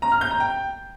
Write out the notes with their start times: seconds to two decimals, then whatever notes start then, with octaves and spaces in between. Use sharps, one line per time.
0.02 A#5
0.12 F6
0.21 G6
0.31 A#5
0.40 G5